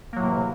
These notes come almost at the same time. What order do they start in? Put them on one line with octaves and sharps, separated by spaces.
A#3 F#3 A2 C3 E3